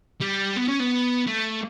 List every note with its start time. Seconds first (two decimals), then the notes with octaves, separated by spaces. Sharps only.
0.21 G3
0.56 B3
0.68 C#4
0.80 B3
1.27 A3